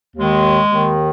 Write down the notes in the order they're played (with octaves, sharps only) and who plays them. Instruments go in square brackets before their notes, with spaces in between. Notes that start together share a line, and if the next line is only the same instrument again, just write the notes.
[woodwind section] D#2 D#3 G#3
D#2
D#3